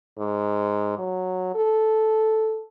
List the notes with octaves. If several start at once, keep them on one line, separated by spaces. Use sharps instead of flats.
G#2
F#3
A4